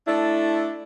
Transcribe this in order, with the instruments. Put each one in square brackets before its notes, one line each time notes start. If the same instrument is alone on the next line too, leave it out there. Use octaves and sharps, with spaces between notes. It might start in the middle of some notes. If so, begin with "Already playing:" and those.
[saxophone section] A3 D4 E4